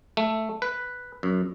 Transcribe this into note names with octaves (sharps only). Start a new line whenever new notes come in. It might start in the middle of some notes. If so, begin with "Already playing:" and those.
A3
B4
F#2